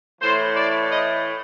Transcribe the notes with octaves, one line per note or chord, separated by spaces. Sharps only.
A2 E3 A3 C5
D5
D#5